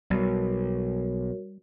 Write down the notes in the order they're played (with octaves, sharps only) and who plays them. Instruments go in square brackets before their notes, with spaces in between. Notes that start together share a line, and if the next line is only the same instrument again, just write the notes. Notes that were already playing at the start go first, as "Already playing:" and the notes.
[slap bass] B1 [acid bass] G3 [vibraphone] F#4 A#4 C#5